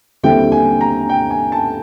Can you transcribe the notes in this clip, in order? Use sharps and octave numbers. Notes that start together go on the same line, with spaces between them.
D#2 D3 G3 C4 E4 G5
G#5
A#5
G5
G#5
A5